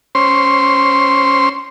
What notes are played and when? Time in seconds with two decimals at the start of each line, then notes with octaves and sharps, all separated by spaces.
0.15 C#4 C5 C6